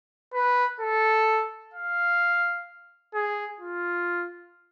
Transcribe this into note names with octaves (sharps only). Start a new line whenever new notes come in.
B4
A4
F5
G#4
F4